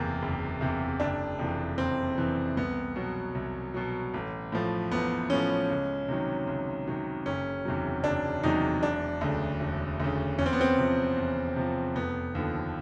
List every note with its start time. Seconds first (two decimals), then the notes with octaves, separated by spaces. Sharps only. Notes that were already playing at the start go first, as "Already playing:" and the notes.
Already playing: F#1 E2 C3 A#3
0.22 F#1
0.61 E2 C3
1.00 F#1 D4
1.39 F2 C3 E3
1.78 F#1 C4
2.18 F2 C3 E3
2.57 C2 B3
2.96 B2 F#3
3.35 C2
3.74 B2 F#3
4.14 A1
4.52 A2 F3
4.91 A1 B3
5.30 A2 F3 C#4
5.70 C#2
6.08 C3 D#3 F#3
6.47 C#2
6.87 C3 D#3 F#3
7.26 F#1 C#4
7.65 E2 C3 D#3 F#3
8.04 F#1 D4
8.43 E2 C3 D#3 F#3 D#4
8.82 E1 D4
9.21 D2 C#3
9.60 E1
10.00 D2 C#3
10.38 E2 C#4
10.46 C4
10.53 B3
10.61 C4
10.78 C3 F3
11.17 E2
11.56 C3 F3
11.95 F1 B3
12.35 D#2 D3 F3